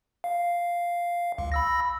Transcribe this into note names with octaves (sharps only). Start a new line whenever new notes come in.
F5
C#2
B5 E6 A#6